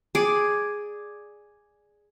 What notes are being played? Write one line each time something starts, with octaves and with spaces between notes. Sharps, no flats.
G#4 D5